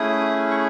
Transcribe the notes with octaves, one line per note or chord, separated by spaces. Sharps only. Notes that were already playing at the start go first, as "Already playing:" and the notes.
Already playing: A3 C#4 E4 G#4 D#6
C#6